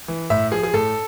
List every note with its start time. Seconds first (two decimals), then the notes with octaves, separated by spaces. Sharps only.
0.08 E3
0.30 A2 E5
0.52 F3 G#4
0.63 G#4
0.73 A2 A4